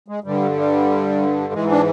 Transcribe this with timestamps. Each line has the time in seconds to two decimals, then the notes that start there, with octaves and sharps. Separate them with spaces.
0.08 G#3
0.24 G2 D3 G3
0.56 G3
1.53 G#2 E3 G#3
1.70 D4